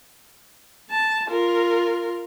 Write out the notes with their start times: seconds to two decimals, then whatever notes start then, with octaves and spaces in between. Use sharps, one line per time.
0.90 A5
1.28 F4 A#4